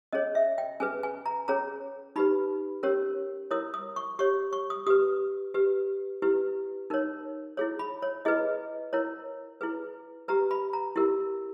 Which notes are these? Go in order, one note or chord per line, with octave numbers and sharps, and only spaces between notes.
C#4 G#4 C#5 D#5
E5
G5
C#4 G#4 B4 G#5
G#5
A#5
C#4 G#4 C#5 A#5
D#4 G4 B4 B5
C#4 G4 A#4 C#5
E4 A#4 C#5 D#6
D#6
C#6
G4 C#5 C#6
C#6
D#6
G4 B4 D#6
G4 B4
E4 G4 B4
D#4 A#4 C#5
E4 G#4 C#5
B5
C#5
E4 G#4 B4 D#5
E4 A#4 C#5
E4 G#4 B4
G4 B4 A#5
B5
A#5
E4 G4 A#4